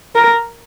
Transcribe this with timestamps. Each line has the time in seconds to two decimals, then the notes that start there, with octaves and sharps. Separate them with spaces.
0.16 A#4